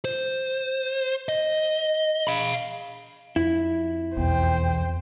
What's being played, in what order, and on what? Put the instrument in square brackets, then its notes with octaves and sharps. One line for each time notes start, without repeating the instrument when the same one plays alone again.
[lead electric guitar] C5
D#5
F5 B5
[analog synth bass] F2 [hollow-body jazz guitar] E4
[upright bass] B1 E2 [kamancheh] C5 G5